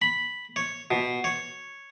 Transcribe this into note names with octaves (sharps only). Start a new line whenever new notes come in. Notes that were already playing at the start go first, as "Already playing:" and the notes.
B5
C#5
B2
C#5